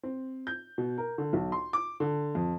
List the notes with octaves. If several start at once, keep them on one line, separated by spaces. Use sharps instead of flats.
C4
G6
B2
A#4
D3
B1
C6
D6
D3
F2